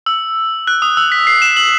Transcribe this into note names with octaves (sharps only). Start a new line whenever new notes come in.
E6
F#6
D#6
E6
B6
C7
E7
F#7